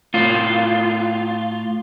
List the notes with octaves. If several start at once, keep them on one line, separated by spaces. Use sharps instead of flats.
A2 F4